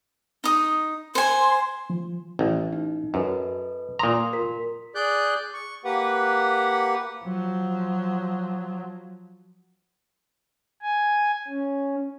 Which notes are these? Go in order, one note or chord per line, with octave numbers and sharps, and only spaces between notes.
D#4 D#6
C5 G#5 C6
F3
A1
D#4
F#2 A4 B4 D#5
A#2 A#5 C6 D#6
F4 A#4 B6
G#4 D5 F#6 G6
C#6
A#3 G4 B4 F#5
F3 F#3
G#5
C#4